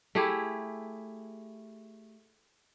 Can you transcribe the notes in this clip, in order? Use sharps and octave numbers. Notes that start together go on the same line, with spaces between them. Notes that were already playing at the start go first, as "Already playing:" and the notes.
A3 E4 G4 G#4